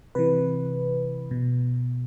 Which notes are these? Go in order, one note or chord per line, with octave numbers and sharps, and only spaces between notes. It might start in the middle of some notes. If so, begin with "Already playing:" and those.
C3 E3 B4
B2